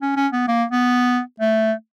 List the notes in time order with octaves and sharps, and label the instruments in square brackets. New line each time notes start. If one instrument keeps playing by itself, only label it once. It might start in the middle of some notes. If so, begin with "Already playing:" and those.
[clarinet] C#4
C#4
B3
A#3
B3
A3